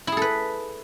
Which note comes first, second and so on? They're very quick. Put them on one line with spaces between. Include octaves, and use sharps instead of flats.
E4 G#4 A4 B4